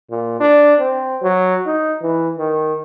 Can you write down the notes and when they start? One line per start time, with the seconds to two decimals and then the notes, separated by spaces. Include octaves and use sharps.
0.11 A#2
0.40 D4
0.80 C4
1.22 F#3
1.66 D#4
2.02 E3
2.38 D#3